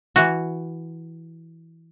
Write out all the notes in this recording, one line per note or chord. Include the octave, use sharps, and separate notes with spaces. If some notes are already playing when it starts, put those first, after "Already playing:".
E3 F#4